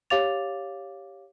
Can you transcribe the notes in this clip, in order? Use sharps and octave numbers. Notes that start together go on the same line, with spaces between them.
G4 C#5 F5 D6 A6 F7